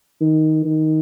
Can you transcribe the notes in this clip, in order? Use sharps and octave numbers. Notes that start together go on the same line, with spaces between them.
D#3
D#3